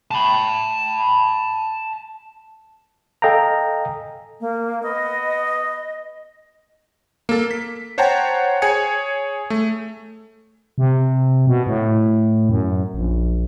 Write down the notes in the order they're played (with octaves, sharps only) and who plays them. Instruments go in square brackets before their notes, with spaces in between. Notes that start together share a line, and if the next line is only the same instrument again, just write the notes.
[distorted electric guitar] A5 B5
[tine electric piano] A4 D#5 F5 G5 G#5 A#5
[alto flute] A#3
[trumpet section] B3 D#6 [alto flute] D#5
[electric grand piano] A#3 A4
B6
C5 C#5 F#5 G5 A5 A#5
G#4 C#5 G#5 G#6 C#7
A3
[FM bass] C3
B2
A2
F#2
A#1